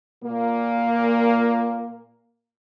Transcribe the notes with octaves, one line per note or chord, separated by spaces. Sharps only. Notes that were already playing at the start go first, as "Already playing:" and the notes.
A#2 A#3